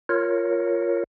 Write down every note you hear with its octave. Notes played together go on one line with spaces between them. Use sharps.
F4 A#4 C#5